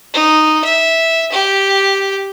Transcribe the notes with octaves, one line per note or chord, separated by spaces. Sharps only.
D#4
E5
G4